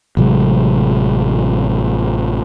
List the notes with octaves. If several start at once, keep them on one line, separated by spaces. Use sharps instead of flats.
A1 C3 F#3 G#3